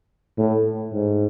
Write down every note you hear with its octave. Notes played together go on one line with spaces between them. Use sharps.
A2
G#2